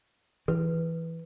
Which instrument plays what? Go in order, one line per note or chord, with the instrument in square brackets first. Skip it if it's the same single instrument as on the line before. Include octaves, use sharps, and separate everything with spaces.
[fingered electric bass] E3 [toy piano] B4